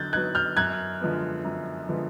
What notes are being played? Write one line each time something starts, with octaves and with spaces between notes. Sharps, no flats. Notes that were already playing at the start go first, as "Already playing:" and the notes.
Already playing: D3 F#3 B3 D#4 F#6 G6 A6
F#3 B3 D#4 F#6 G#6
F6 G6
F#2 F#6 G#6
D3 F3 G#3 B3
F#2
D3 F3 G#3 B3